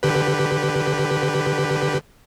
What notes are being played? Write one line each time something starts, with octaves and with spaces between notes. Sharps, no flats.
D3 G4 B4